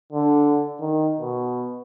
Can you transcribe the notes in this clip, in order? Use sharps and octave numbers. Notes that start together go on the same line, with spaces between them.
D3
D#3
B2